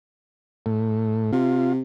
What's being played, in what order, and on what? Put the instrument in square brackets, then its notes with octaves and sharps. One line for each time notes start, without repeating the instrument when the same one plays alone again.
[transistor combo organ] A2
[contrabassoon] C3 [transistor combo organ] F4